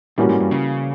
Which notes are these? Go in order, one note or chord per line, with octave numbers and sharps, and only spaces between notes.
A2 E3 G3 A#3 C#4 F#4
G#2
G2
C#3